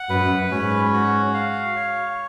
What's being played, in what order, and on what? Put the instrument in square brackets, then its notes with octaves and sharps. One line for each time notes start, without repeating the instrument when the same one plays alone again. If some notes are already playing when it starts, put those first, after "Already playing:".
Already playing: [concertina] F#5
[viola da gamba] F#2 [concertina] B4
[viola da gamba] G#2 [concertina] C#4
[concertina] F#4
F5
C#5